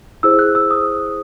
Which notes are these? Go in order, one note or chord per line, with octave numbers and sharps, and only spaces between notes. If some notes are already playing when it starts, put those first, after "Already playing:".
E4 G#4 C5 E6
F#6
E6
D#6